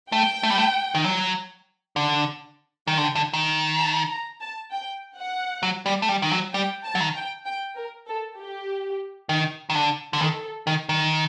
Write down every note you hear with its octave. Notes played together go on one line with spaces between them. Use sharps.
A3 G5
A3
G3
A3
D#3
F#3
D3
D#3 G5
D3
D3
D#3 G5
A5
A#5
A5
G5
F#5
F#3
G3
A3
G3
D#3
F#3
G3 G5
A5
F#3
D#3
G5
G5
A#4
A4
G4
D#3
D#3
D3
D3
D#3 A4
D#3
D#3